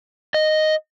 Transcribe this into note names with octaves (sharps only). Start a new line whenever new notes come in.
D#5